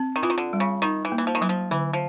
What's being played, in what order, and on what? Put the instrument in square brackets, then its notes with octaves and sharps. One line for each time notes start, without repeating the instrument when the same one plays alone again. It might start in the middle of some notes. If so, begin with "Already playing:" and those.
Already playing: [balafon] C4
[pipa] D#3
[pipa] E3 [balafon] F4
[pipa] D#3
D3
[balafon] G3
[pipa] C#3
[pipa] D#3 [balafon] D#4
[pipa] E3
[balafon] A#3
[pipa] E3
F3
D#3
[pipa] E3 [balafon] F#3
[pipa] F3
[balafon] D3 [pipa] E3
[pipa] F3